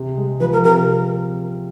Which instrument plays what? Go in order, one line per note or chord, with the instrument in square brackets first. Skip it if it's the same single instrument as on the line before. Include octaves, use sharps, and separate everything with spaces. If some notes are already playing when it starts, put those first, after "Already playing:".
Already playing: [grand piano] C3 C4
G#3
[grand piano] F3 [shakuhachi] B4
[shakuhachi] A#4
[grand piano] C3 [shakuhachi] A#4